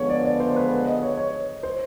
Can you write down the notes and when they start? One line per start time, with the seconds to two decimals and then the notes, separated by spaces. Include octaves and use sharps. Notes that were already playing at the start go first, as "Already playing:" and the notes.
Already playing: D3 F3 G#3 B3 C#5
0.09 D5
0.25 D5
0.40 C5
0.56 B4
0.87 D#5
1.02 C#5
1.17 C#5
1.63 C5